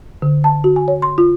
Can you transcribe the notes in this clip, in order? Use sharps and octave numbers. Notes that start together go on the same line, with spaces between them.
D3
A5
F#4
G#5
C#5
C6
F4